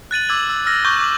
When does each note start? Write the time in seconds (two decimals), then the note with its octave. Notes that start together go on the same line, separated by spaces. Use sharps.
0.11 F#6 A6 D#7 F#7
0.29 D6 E6 G#6 F#7
0.49 E6
0.66 E6 F6 A#6
0.85 C#6 D6 G6 G7
1.01 D6 F#7